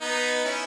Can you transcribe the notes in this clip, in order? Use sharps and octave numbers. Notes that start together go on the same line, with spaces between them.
B3 D#4
C#4 E4